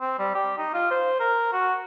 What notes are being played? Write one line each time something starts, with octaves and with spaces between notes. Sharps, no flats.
C4
G3
G4
D#4
F4
C5
A#4
F#4